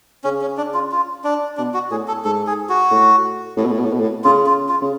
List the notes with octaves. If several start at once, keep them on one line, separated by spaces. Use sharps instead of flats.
C#3 C#4
C#4
D4
F4
F4
D4
B2 D4
F#4
A2 G#4
A4
G#2 A4
G#4
F#4
A2
A2
B2
A2
B2
A2
B2
A2
C#3 F4
F4
F4
C#3